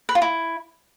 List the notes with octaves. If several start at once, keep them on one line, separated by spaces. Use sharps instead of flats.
B4
F4
E4